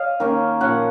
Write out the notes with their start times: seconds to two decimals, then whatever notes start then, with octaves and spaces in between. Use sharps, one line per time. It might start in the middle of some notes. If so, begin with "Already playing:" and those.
Already playing: C#5 D#5 F5
0.20 D#3 A#3 C#4
0.60 A#2 F3 A#3 C#4 F#5